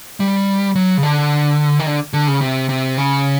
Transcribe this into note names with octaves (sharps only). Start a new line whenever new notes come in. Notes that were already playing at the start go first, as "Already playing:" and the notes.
G3
F#3
C#3
D3
D#3
D3
D3
C#3
C3
C3
C#3